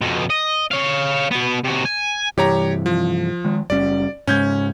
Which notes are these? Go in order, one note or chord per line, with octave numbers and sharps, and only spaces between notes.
F2 B2
D#5
C#5 F5
B2 B3
C3 F#4
G#5
G2 C3 E3 G4 C#5 A#5
F3
D#3 G#3
F#1 G3 C#4 D5
G#2 C#3 G#3 C#4 G6 G#6